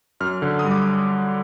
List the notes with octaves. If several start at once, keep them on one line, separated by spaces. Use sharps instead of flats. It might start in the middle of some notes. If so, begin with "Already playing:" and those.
F#2 F6
D3
D#6
G3
D6